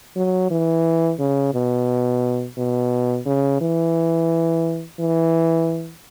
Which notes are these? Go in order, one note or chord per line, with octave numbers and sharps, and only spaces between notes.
F#3
E3
C#3
B2
B2
C#3
E3
E3